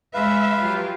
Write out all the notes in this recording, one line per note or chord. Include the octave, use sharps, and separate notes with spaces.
G#3 B4 E5 F5
F#3 F4 G4